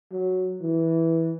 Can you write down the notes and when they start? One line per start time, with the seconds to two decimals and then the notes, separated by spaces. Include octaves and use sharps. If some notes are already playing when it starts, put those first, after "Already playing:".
0.12 F#3
0.61 E3